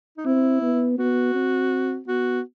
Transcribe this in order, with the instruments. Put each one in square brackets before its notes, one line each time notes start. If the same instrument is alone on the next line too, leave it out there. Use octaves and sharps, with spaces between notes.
[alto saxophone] D#4
[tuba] C4 [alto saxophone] E4
[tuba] B3
[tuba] B3 [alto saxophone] F#4
[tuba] C4
[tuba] B3 [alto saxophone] F#4